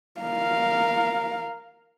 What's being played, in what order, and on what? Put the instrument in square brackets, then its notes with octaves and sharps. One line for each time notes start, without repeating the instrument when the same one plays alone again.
[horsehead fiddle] A#4 F5